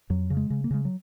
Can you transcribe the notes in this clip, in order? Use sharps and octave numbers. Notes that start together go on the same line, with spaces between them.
F2 F#3
C#3
G#3
C#3
A#3
C#3 G#3
F#3